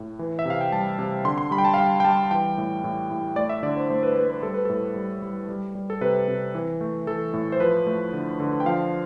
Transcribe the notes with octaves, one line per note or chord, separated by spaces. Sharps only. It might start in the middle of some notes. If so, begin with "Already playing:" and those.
Already playing: A2
E3
E5
C3 F5
G5
G3 A5
C3
D3 C6
C6
G3 B5
G5
A5
F5
G3 G5
G5
G3 A5
E3 G5
A2
A2
A2
A3 D5
E5
D3 D5
C5
A3 C5
B4
A3 B4
B4
G3 A4
B4
A2 A4
G3
G3
G3
G3
A4
C3 B4
C3
E3
A3
E3 A4
A2
C5
F3 B4
A3
D3
D3
G5
F3 F5